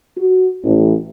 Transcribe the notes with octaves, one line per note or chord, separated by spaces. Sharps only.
F#4
A1